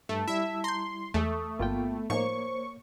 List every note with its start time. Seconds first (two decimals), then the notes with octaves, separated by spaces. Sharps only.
0.09 G2 A3 A5
0.28 G3 E4 E5
0.64 A#5 C6 G6
1.14 E2 G#3 A3 A4 C#6 D#6
1.59 G1 A#3 B3 F4 G5
2.10 A2 F3 A#3 D#4 C5 C#5 C#6